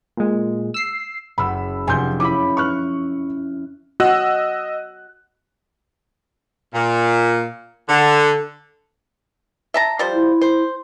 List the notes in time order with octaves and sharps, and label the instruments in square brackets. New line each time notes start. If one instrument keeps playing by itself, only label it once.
[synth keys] A#2 G#3
E6 C7
[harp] F#1 [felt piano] B5 E6
[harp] F1 [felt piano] G#5 C6 G6
[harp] C#4 E4 B5 [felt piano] D6
[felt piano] C#6 F6 F#6
[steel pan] F#4 [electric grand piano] D#5 E6 F#6
[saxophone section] A#2
D3
[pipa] E5 A5 A#5
F3 G3 C5
[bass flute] E4
[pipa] C5